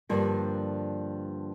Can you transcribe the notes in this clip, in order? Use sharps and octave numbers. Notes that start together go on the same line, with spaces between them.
G2 D3 F3 A#3